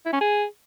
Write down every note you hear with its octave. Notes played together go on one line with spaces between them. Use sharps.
E4
C#4
G#4